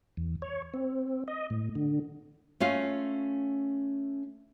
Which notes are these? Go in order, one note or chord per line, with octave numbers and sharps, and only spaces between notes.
E2
C#5
C4
D#5
A2
D3
A3 C#4 F4 F5